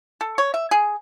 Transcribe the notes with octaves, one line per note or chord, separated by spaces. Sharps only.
A4
C#5
E5
G#4